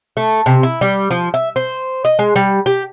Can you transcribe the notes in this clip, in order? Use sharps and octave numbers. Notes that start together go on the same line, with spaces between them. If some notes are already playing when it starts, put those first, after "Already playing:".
A3
C3
E4
G3
F3
E5
C5
D#5
G#3
G3
G4